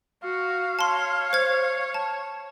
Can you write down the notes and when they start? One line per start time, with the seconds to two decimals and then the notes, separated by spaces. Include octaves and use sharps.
0.23 F#4 F5
0.79 C#5 A5 C6
1.33 C5 G#6
1.94 A5